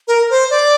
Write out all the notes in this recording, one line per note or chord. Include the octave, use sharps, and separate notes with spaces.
A#4
C5
D5